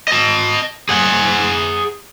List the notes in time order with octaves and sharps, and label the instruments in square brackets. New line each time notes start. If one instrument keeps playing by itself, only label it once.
[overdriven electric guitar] D#5 A5
G#4 F#5